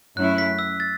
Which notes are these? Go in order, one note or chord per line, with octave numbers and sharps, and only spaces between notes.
F#2 F#3 A3 C#4 E4 F#6
B6
E6
A6